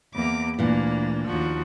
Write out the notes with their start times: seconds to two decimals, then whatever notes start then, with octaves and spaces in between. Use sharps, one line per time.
0.15 E2 A#3 D6
0.59 D2 A#2 E3 A#3 D4
1.24 D#2 F3 F#4